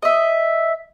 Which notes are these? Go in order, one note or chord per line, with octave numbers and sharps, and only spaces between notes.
D#5 E5